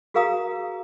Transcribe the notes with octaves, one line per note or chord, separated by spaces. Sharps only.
F#4 G#4 A#4 F5 A#5 D#6